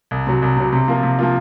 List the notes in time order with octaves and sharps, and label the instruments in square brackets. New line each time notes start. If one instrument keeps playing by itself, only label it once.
[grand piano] C2
C3 F#3
C2
C3 F#3
C3
F3 A#3 F4
C3
F3 A#3 F4